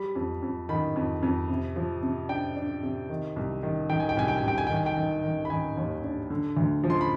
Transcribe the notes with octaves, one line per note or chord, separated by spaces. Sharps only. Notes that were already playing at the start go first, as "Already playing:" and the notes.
Already playing: G3 B5
F2
F2
D#3 B5
F2
F2
C3
F3
C3
D4 G5
D4
C3
D#3
C2
D#3
D#3 G5
G#5
G5
C2 G#5
G5
G#5
C2 G5
G#5
D#3 G5
G#5
G5
D#3
D#3
B5
D#3 G#5
D#2
D4
D3
D2
F3
C6
B5